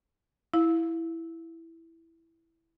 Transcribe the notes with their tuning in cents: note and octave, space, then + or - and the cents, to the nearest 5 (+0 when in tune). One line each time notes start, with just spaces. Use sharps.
E4 +0 F5 +5